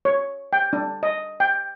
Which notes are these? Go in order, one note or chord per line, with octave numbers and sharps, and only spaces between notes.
C#5
G5
D4
D#5
G5